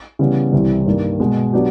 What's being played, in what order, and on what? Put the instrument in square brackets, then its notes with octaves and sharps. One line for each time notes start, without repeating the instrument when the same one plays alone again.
[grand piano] C#3 E3 G3 B3
C2 C3 E3 G3 C4
G2 D#3 G3 A#3
B2 G#3 B3
F#3 B3 D4 G4